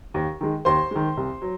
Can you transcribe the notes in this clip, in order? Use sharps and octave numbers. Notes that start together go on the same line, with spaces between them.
D#2
D#3 G#3
D#2 C5 C6
D#3 G#3
C2
F#3